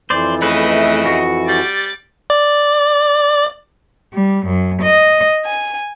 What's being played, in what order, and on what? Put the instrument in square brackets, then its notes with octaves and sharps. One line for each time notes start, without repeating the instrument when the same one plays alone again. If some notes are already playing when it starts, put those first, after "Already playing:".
[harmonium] F2 E3 [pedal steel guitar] C5 D5
[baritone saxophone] C#3 [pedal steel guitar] A3 B4 [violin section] D#5 E5
[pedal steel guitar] F#4
[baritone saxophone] G3 [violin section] D6 A6
[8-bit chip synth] D5
[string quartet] G3
F#2
D#5
G#5